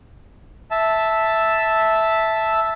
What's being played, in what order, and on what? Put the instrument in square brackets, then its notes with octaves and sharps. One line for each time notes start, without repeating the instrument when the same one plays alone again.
[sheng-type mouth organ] E5 A5